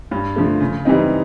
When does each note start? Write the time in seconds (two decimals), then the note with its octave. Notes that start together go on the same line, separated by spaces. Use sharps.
0.11 G2
0.36 D3 F3 A3
0.60 C#3
0.85 E3 G3 C4 D#4